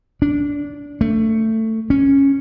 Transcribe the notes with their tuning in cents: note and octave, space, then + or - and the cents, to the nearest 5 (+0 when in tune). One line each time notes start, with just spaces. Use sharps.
D4 -20
A3 +15
C#4 -10